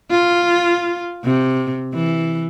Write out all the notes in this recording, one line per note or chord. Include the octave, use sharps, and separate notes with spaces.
F4
C3
E3